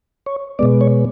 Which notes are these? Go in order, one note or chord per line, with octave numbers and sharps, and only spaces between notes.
C#5
B2 G#3 B3 D5
C#5